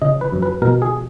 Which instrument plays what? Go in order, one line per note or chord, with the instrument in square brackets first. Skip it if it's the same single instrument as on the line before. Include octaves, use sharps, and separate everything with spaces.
[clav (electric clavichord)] C#3 D#5
B4
F#2
B4
B2 A#4
G#4